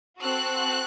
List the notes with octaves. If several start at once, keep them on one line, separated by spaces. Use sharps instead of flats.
C4 F#4 A4 F#6